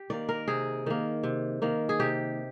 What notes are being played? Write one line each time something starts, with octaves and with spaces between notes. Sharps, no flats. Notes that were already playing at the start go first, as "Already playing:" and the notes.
Already playing: G4
D#3 A#3 D5
A#4
C3 G#4
D#3 A#3
C3
D#3 A#3
G#4
C3 G4